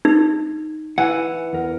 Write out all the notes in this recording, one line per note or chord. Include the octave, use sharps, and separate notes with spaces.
D#4
E3 F#5
E2 A#4